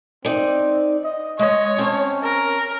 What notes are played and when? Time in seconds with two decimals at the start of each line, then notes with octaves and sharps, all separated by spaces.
0.25 C4 D#4 D5
1.04 D#5
1.39 G#3 C#5 D#5
1.78 C4 C#4 A5
2.24 A#4